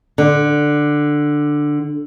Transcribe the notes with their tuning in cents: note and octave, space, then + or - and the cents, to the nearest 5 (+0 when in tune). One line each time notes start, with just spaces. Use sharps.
D3 +10